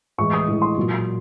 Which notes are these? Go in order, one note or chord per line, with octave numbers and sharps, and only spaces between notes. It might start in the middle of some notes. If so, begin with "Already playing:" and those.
A2 E3 G#3 C#6
D#6
A2 E3 G#3
C6
A#2 F#3